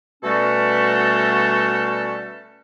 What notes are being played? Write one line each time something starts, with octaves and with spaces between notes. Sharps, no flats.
B2 G3 A3 C#4 F#4 A4